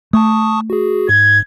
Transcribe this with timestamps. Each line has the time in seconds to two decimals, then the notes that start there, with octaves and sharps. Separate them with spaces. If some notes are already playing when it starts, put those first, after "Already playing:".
0.13 A3 A5 C#6 D#6
0.70 F#4 G#4
1.09 G#2 G#6